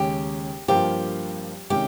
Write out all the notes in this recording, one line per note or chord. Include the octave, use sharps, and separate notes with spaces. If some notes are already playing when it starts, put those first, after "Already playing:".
Already playing: D#2 C#3 G#3 C#4 G4
G2 F3 A#3 F4 G4 C5
C3 D#3 G#3 C#4 G4